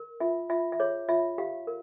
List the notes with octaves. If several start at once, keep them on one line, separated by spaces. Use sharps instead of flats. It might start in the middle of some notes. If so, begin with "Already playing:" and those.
Already playing: A#4
F4 E5
F4 E5
E5
G#4 C#5
F4 E5
G4 F5
A#4